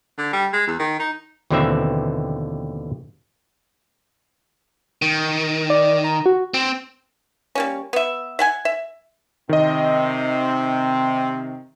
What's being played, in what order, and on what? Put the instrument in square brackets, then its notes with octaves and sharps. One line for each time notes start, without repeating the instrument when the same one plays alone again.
[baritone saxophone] D3
G3
G#3
E2
D#3
D#4
[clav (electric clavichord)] D#2 B2 D3 E3 C4 E5
[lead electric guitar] D#3
[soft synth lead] D5
A#5
F#4
[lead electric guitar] C4 [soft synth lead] D7
[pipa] G3 A#3 C#4
B3 E5
E5 F#5 G#5
E5
[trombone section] C3 C4 [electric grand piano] D#3 D#5